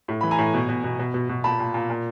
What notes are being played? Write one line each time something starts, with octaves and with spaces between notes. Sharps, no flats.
A2
E3 B5
G#5 A#5
A2
B2
B2
B2
B2
B2
B2
A#2 A5 B5
A#2
A#2
A#2